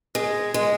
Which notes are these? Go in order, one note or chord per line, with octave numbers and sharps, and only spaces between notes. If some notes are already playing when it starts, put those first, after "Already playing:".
G#3
G#3